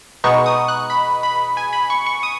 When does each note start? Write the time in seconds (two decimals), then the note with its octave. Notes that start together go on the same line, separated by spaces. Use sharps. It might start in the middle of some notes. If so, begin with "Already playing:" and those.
0.24 B2 G#3 B3 D#4 C#6
0.46 D#6
0.68 F#6
0.90 B5
1.23 B5
1.57 G#5
1.73 B5
1.90 C#6
2.06 C#6
2.23 D#6